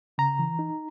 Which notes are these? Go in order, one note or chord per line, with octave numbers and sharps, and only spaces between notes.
C#3 A#5
E3
D#4